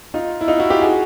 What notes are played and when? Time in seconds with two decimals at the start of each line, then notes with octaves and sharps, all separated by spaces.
0.14 D#4 F4
0.41 E4
0.48 D#4 F4
0.59 E4 F#4
0.70 F4 G4
0.82 F#4 G#4